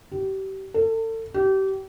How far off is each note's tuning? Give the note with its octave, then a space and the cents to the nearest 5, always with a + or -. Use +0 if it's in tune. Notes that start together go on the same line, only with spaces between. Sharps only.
G4 -30
A4 +35
G4 -30